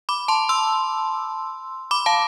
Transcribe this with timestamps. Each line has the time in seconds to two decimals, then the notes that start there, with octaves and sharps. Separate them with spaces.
0.09 B5 D6
0.28 A5 C6
0.49 C6 E6
1.91 B5 D6
2.06 F5 A5